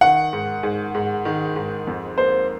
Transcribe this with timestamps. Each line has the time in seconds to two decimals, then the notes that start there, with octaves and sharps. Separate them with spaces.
0.01 D#3 F#5
0.33 G#2
0.63 G#2
0.94 G#2
1.25 D#3
1.56 G#2
1.87 F2
2.17 A#3 C5